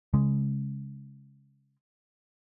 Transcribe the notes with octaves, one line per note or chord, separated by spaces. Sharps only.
C#3 G#3